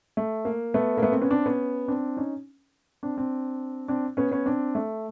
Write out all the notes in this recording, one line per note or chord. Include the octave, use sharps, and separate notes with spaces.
A3
A#3
A3 B3
A#3
A3 B3
A#3 C4
B3 C#4
C4 D4
B3 C#4
C4 D4
C#4 D#4
C4 D4
C4 D4
C4 D4
B3 C#4
B3 C#4
C4 D4
A3